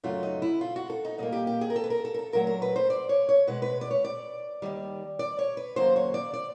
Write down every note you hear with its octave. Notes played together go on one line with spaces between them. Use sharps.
F#2 C#3 F#3 A3 F4
D#4
E4
F4
F#4
A4
D#4
A#2 G3 A#3 D#4
G4
G4
G#4
A#4
A4
B4
A#4
A4
A#4
A4
A#2 F#3 A3 A#4
A#4
B4
C5
D5
C#5
C#5
B2 G#3 B4
B4
D5
C#5
D5
D#2 D#3 G3
D5
C#5
B4
D#2 C#3 F#3 A#3 C5
C#5
D5
D5